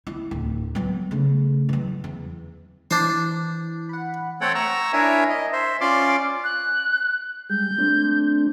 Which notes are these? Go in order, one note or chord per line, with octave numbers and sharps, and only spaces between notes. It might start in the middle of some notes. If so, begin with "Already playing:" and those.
E4
D1
F#3 B3
C#3 A3
E3 F#3
E2
E3 D4 C5
F#5 B5
A3 C4 A4 C#5 F#5 G5
A#5 C#6 E6
D4 E4 A#4 C#5 E5 G#5
D#5
C5 E5
C#4 F4 D5 C6 D6
F#6
G3 G#3 G6
A3 C4 D4